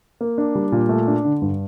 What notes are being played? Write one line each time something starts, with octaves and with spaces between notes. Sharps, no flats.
A#3
D4
G3
A#2
A3
D4
D3
G2